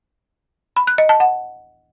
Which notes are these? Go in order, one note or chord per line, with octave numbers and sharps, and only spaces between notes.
B5
F#6
D#5
A5
F#5